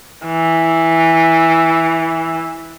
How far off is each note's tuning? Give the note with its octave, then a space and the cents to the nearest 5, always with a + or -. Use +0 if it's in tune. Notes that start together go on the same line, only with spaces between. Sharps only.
E3 -5